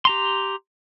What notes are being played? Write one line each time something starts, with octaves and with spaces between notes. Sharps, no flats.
G4 A#5 C6